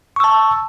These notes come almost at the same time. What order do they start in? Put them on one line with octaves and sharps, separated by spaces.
C#6 E6 A5